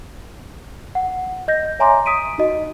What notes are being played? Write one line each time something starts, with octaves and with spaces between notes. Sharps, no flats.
F#5
D#5 G6 A#6
C#5 E5 G#5 A#5 C6 D6
D#6 B6 D7 D#7
D#4 F#4 D#5